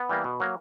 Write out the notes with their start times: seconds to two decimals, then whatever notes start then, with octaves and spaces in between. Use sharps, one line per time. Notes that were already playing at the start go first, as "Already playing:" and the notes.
Already playing: B3
0.09 E3 G3 A#3
0.24 B2
0.40 F#3 A#3